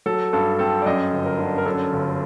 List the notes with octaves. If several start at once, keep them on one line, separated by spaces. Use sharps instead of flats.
F#3 A4
G2 A4
C4 A4
D5
F#2 D#5
G1
A#4
D3
A#4
F#2 A4
G1